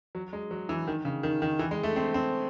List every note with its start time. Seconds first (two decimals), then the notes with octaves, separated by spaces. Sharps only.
0.15 F#3
0.33 G#3
0.51 F#3
0.69 E3
0.87 D#3
1.05 C#3
1.23 D#3
1.42 D#3
1.59 E3
1.71 G#3
1.83 A3
1.96 C4
2.14 C4